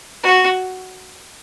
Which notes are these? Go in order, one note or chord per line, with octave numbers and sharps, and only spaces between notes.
F#4